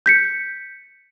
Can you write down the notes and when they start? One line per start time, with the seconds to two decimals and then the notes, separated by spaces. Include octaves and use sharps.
0.06 G6 B6 C#7